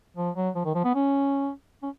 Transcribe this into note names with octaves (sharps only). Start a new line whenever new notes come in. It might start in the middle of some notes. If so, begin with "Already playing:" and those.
F3
F#3
F3
D#3
F3
B3
C#4
C#4